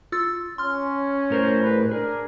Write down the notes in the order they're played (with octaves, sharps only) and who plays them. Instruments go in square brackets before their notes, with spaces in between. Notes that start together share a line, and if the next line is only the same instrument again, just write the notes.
[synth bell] F4 E6 A6
[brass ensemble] C#4 [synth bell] C6 F6
[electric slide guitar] A2 A#4 C5
[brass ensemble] C#3 G3 B4
[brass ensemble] D4 A#4 [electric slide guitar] G#4